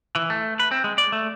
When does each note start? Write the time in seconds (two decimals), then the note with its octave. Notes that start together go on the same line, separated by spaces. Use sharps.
0.16 E3
0.30 A3
0.60 B4
0.71 C4
0.84 G#3
0.98 D5
1.12 A3